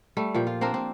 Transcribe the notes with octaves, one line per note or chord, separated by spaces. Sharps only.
G3 A3
A#2 F3 G4
F4
A#3 C4 D4 A#4
C4